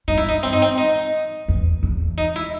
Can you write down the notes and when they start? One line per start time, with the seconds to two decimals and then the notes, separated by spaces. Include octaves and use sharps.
0.08 G2 D#4
0.18 E4
0.29 D#4
0.43 C4
0.53 D#4
0.62 C4
0.78 D#4
1.48 E2
1.83 E2
2.18 D#4
2.36 E4